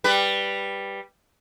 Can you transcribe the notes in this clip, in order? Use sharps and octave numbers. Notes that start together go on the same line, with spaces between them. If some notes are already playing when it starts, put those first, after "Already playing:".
G3 B4